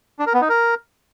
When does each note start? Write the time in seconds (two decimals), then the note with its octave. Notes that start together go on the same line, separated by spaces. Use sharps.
0.19 D4
0.26 A#4
0.34 B3
0.41 D#4
0.49 A#4